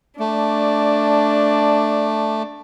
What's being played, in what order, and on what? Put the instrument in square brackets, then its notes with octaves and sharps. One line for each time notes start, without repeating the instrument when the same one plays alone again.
[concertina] A3 [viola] D4 D5